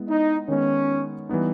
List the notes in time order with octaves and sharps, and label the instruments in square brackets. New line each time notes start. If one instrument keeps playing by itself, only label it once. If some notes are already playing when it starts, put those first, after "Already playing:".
Already playing: [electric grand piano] G#3 B3 E4
[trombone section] D#4
[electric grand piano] D#3 G#3 B3 [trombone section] C#4
[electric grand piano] E3 G3 B3 D#4